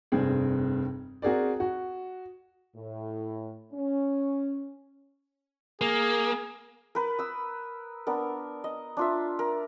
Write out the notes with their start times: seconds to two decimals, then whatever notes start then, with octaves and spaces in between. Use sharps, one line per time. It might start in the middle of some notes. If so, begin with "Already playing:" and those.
0.12 F1 G2 C4 G#4
1.22 C4 F#4 G#4 A#4 D5
1.60 F#4
2.76 A2
3.73 C#4
5.81 A#3 G#4
6.95 A#4 B4
7.19 D#6 E6
8.07 B3 D4 A#4
8.64 D#5
8.97 D4 F4 E5
9.39 A#4